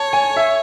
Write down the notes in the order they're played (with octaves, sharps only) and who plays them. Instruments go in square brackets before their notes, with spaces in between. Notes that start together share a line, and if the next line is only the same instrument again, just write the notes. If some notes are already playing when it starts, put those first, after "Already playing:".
Already playing: [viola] C#5 [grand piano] A5
[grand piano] G#5
E5